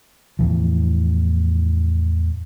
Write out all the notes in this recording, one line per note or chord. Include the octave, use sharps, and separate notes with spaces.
E2 A2 E3 F3